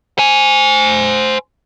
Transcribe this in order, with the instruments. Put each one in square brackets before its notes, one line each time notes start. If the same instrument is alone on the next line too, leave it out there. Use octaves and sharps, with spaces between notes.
[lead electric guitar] C5 G#5